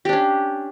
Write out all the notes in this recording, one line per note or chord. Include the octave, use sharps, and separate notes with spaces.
C#4 D4 G4